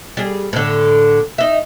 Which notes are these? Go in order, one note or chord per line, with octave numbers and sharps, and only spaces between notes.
G3 G#4
A2 D3
D#4 E5